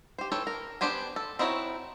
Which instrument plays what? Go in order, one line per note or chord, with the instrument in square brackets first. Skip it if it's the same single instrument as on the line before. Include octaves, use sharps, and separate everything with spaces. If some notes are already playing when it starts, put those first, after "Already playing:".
[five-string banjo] G4 C5
E3 A4 C#5 G5
A#4
B3 D4 G4 C5 G#5
A4
C4 D#4 E4 F#4 C#5